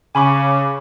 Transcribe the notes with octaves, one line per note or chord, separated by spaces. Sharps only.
C#3 G#5 B5 C#6 D6